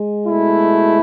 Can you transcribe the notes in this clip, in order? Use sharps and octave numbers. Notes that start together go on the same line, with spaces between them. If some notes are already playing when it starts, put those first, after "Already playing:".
Already playing: G#3
B2 A3 E4